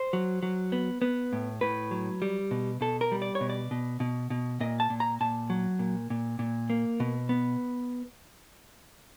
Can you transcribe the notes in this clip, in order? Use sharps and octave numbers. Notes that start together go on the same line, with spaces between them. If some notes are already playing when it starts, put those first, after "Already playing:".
Already playing: C5
F#3
F#3
B3
B3
A2
A2 B4
F#3
G3
B2
B2 A4
A#4
G3
D5
C#5
B2
D5
B2
B2
B2
A#2 D#5
A5
A#2
A#5
A#2 A5
F#3
A#2
A#2
A#2
A#3
B2
B3